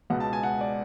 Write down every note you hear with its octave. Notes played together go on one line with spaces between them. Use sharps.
C#2 B2 F#5
A5
G#5
F#5
D5